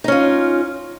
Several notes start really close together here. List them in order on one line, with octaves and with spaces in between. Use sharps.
D#4 C#4 F4